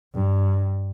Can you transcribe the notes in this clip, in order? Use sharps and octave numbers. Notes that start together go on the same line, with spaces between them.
G2